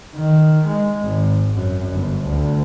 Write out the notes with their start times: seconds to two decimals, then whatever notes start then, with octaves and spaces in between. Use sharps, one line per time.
0.15 D#3
0.67 G#3
1.02 G#1
1.54 F#2
1.93 G1
2.27 D2